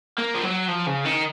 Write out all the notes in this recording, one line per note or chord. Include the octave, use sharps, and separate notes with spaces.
A#3
F3
F#3
F3
C#3
D#3